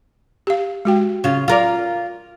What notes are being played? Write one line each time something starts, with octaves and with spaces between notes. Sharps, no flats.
G4 F5
G#3 F#4 G5
C#3 F4
F4 A#4 D5